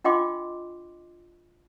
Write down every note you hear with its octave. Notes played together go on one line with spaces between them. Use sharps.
D4 F4 D#5 G5 C6 D6